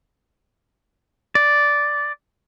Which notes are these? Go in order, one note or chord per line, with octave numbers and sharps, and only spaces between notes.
D5